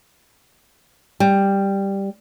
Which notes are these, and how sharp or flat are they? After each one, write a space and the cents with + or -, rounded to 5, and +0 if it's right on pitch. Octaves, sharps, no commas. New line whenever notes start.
G3 +5